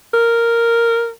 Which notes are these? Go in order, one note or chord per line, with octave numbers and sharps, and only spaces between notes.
A#4